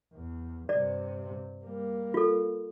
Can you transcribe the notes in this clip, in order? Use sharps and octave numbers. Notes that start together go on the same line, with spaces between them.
E2
G2 C3 D5
G3 A#3
F4 A4